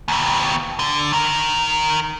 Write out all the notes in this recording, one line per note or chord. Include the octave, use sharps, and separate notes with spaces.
D#2 B2
D3
D#3 A#4